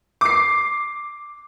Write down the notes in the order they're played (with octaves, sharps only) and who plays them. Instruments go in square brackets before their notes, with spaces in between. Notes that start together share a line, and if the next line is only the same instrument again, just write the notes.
[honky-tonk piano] D6 C7